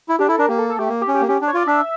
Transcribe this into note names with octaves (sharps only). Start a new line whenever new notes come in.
E4
D4 G4
E4 A4
D4 A#4
A#3 G4
A4
A4
A3 G4
A#3
G4
C#4
G4
A#3
C#4 G4
D4
C#5
F4 D5
D4 E5